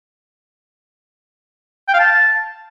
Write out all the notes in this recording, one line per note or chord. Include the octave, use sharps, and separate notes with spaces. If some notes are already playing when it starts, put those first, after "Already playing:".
G5
F5
A5